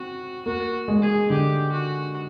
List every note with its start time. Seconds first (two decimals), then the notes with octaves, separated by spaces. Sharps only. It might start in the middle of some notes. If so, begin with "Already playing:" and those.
Already playing: C4 F#4
0.46 A#3 F#4
0.88 G#3
1.02 G#4
1.30 D3 G4
1.72 F#4